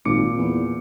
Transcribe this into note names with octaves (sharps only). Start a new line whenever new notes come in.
G#1 A#2 D6 C#7
E2